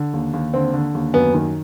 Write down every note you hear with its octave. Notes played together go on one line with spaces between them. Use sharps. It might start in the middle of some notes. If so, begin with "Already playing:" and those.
Already playing: D3
D#2
D#2
D3 C4
D3
D#2
F#2 B3
D#3